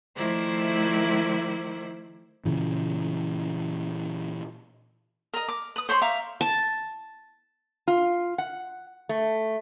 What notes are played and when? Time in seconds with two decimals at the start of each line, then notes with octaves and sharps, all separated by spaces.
0.16 D#3 F3 A3 E4 C5 D5
2.45 A#2 C#3 E3
5.34 A#4 D#5
5.48 D6
5.76 B4 D#6
5.89 C5 C#5 B5 C6
6.02 E5 F5 A#5 D6
6.41 A5
7.87 F4
8.38 F#5
9.09 A3